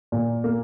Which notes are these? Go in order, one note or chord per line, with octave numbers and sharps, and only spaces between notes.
A#2
A#3